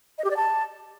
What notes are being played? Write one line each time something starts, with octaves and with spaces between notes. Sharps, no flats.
D#5
G4
D5
A5